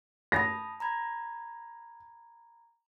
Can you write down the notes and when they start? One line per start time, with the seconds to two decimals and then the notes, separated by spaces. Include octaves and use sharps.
0.32 A5 B5 D#6 A#6
0.80 A#5 B5 G#6